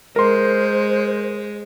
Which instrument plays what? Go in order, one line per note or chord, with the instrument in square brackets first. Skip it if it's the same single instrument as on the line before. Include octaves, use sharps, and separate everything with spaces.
[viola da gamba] G#3 [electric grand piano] A#4 C6 [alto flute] C5